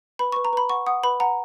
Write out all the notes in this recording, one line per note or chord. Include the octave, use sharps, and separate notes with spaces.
B4 B5
B4 C#6
A#5
B4 B5
F#5 C#6
F#5 D#6
B4 B5
F#5 A#5